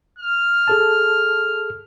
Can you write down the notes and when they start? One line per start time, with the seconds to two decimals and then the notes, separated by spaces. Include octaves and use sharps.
0.19 F6
0.68 G#4 A4 A5